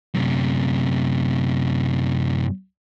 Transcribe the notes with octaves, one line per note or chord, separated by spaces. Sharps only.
F#2 C3